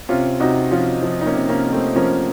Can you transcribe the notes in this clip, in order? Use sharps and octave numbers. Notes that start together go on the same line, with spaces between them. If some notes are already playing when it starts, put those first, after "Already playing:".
C3 C#4 F4
C3 D#4 F#4
F3 C#4 F4
F3
D#4
A#3 C#4
C3
A#3 C#4
C3
A3 C4
F3 A#3 C#4